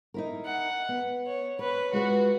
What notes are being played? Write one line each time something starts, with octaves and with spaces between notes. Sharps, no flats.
D#4 E4 A#4
F#5
B3
C#5
B4 C#5
G#3 F4 F#4 B4